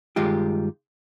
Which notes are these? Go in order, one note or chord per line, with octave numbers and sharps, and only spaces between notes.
G2 D#3 G#3 F4 G4